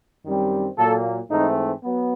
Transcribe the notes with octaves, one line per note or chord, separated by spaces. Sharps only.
F#2 D#3 G3 C4
A#2 F#3 A#3 A4
G#2 E3 A3 C4 D#4
F#3 B3